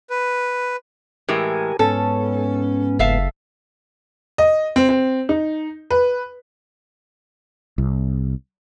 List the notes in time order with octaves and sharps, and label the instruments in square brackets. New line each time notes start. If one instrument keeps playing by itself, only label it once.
[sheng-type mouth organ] B4
[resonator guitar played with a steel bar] A2 E3 G#3 [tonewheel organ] G4 A#4 G#5
[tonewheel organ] G#2 B3 [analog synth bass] C#4 [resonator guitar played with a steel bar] A4
[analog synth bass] F#1 [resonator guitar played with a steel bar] A4 E5 F5
[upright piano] D#5
C4
C4
D#4
B4
[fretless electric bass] C2